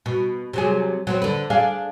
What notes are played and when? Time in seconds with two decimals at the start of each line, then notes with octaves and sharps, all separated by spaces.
0.06 B2
0.53 C3 F#3 G#4
1.07 F#3 B3 C4
1.22 D3 B4
1.50 D4 G#4 F5